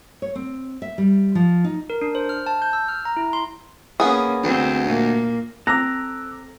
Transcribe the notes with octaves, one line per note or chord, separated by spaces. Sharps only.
C#5
C4
E5
G3
F3
D#4
A#4
D4
C5
F6
A5
G6
E6
F6
A#5
E4
C6
A#3 B3 C#4 G#4
D2 D3 C4
A#2 A#3
C4 A4 A#5 D6 E6 F#6 A#6